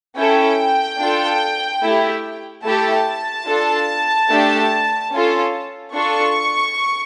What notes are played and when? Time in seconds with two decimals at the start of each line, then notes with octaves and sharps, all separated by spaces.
0.16 C#4 E4 A4 G5
0.99 D4 F4 A4
1.82 A3 E4 G4
2.64 A3 E4 G4 A5
3.46 D4 F4 A4
4.29 A3 D4 G4
5.11 C#4 F4 A4
5.93 D4 F4 A4 C#6